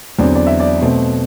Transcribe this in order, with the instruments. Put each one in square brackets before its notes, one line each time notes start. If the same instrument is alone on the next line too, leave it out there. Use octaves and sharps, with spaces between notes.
[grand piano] E2 D3 F#3 C4 D5
D5
E5
D5
B2 A3 C4